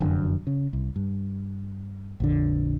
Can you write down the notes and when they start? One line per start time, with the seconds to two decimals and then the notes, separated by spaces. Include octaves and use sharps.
0.01 F1 F#2 D3
0.47 C#3
0.73 C2
0.96 G2
2.20 A#1 F2 D3